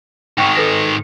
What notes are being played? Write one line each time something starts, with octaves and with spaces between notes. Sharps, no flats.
G#2 D#3 G5 C#6
A4 B4 A#6